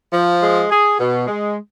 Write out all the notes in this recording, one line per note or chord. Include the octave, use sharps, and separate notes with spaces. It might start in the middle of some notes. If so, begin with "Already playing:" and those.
F3
G#3
G#4
B2
G#3